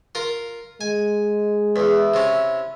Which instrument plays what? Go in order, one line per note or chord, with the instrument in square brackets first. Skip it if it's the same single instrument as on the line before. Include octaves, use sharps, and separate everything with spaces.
[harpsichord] F4 A#4
[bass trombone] G#3 [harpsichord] G#5
[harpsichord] E2 [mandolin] E4 E5
[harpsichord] C3 C#4